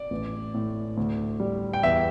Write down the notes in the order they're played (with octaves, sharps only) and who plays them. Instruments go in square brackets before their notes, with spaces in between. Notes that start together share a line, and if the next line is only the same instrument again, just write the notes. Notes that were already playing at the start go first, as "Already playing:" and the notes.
Already playing: [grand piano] D5
A1
A2
D2
G3
G5
E2 E5